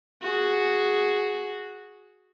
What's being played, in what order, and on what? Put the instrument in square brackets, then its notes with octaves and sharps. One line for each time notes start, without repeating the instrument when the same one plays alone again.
[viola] F#4 G#4